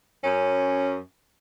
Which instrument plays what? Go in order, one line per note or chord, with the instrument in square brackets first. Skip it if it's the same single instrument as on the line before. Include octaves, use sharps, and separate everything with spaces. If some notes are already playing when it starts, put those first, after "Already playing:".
[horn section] F#2 C#4